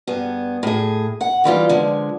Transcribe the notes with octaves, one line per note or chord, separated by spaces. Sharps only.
G2 B3 G#4
A2 G#4
F#5
D#3 E3 G3 F4
D3 F3 G#3